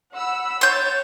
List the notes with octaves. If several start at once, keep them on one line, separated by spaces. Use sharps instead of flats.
F#5 B5 E6
C#5 C6 G6 A6